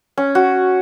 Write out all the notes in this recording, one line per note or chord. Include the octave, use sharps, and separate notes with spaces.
C#4
F#4